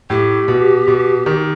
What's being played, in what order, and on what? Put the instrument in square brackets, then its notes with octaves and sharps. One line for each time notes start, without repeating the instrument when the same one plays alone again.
[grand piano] A2 [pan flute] G4
[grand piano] B2
B2
D#3